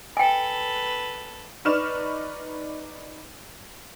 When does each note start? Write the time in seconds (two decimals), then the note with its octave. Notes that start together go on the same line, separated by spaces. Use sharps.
0.17 A4 B4 G5 G#5
1.65 D#4 B4 D5 C#6 F6 E7